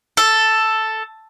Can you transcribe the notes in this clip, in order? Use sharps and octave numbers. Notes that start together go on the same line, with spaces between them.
A4